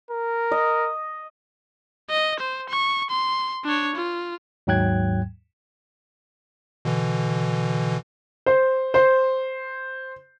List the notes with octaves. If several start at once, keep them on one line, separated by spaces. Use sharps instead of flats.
A#4
D#5
D#5
C5
C#6
C6
D4 C#5
F4
D#2 G#2 F#3 G5 F#6 G#6
B2 D3 E3
C5
C5